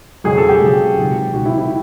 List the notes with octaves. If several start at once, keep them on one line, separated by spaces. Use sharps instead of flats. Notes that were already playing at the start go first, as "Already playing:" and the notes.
F2 C#3 F#3 G#4
A4
G4
F2 C#3 F#3
C#2 C3 D#3 F#3
C#2 C3 D#3 F#3 F#4
E4
E4